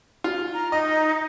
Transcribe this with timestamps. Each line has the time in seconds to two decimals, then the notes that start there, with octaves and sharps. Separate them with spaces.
0.24 F4
0.54 A#5
0.72 D#4 D#5